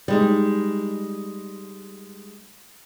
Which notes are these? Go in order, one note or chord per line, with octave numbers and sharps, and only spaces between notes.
G3 G#3 D#4